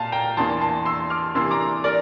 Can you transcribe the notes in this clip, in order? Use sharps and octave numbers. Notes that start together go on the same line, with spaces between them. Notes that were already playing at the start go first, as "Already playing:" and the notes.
Already playing: A#2 F5 A5
G5 A#5
E2 E3 A#3 D4 A5 C6
A5 C6
C6 E6
D6 F6
C3 E3 A#3 D4 C6 E6
A#5 D6
A#4 D5